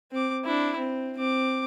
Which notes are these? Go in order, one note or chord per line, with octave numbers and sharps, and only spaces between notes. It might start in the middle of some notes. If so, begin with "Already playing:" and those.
C4 D6
D4 E4
C4
C4 D6